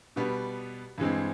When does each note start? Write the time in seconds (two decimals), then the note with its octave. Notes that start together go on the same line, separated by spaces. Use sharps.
0.16 B2 G3 B3
0.98 G2 E3 G#3 C4